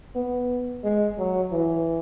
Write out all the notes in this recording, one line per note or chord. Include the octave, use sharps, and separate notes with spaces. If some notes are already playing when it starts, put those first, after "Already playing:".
B3
G#3
F#3
E3